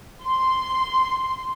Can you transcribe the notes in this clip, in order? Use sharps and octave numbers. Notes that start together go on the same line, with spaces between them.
C6